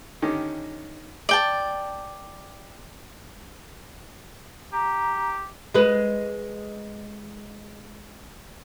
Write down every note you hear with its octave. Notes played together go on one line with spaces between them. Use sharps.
D3 D#3 C#4 D#4 G4
D5 G5 A5
G4 A#5
G#3 B4